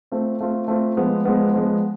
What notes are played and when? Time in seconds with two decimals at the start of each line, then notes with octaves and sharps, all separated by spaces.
0.12 A3 C4 F4
0.41 A3 C4 F4
0.68 A3 C4 F4
0.97 F3 G#3 B3
1.25 F3 G#3 B3
1.53 F3 G#3 B3